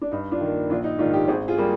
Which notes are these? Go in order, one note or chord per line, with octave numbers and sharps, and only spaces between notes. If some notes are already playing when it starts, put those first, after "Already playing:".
D4
G2 D#4
D4 F4
D#3
A#3
A#1 D4 F4
D#4
G#2 D#3 D4 F4
D#4 G4
G#1 G#4 C5
F4 G#4
G3 A#3